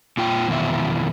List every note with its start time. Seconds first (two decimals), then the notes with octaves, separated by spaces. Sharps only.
0.17 A#2 F4 G5
0.48 F2 B2 D#3 E3 F4 E5